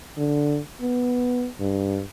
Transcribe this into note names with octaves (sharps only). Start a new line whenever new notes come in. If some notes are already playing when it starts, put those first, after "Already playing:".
D3
B3
G2